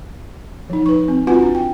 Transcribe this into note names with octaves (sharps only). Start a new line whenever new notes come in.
F3 D#4
B4 C#6
C4
C4 F4 F#4 B4 F#5 G#5
D4
G5